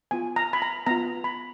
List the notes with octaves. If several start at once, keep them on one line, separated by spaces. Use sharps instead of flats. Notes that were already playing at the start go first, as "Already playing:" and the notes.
B3 F4 G#5
A#5
B5
A#5
B3 F4 A#5
B5